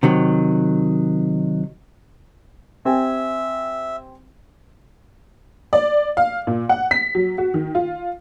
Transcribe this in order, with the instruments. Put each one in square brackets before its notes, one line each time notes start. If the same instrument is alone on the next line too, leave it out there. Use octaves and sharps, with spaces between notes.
[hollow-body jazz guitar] C3 D#3 F#3
[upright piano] C4 G4 G#5 [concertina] E5
[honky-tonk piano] D5
F5
A#2
F#5
B6
F#3
F#4
D#3
F4